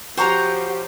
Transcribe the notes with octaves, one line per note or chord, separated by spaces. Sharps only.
F3 F#4 G4 C5 C#5 A#5